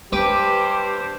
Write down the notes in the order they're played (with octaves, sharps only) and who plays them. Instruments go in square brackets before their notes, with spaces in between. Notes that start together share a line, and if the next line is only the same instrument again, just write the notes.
[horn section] G2 C5 [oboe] G4 [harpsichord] B4 D6